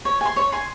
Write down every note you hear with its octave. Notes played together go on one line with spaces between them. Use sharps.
C#5
G#5 C6
C#5
G#5 C6